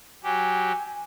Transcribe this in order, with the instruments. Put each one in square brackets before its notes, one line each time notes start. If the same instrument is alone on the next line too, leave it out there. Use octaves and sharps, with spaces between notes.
[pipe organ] F#3 G4 [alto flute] G#5